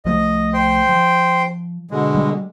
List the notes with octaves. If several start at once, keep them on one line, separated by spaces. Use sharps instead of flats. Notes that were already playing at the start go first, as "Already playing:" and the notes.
C2 F3 A3 D#5
C5 G5 C6
F3
B2 D3 G#3
G3